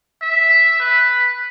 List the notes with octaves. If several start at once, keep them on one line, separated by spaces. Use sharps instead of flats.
E5
B4